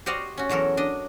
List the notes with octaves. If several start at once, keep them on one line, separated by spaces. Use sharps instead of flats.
F#4 G4 C5 D5 D#5 F5
C#4 F#4
E2 F#3 A4 A#4
D4 D#5